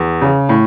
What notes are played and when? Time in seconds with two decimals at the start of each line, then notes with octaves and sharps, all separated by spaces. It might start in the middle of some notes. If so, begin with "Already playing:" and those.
Already playing: E2
0.21 C#3
0.49 A2